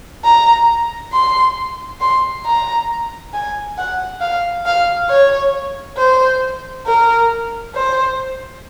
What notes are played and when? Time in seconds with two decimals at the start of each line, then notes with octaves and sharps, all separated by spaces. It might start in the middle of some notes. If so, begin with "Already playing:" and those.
0.24 A#5
1.13 C6
2.01 C6
2.45 A#5
3.34 G#5
3.77 F#5
4.21 F5
4.66 F5
5.09 C#5
5.97 C5
6.86 A#4
7.75 C5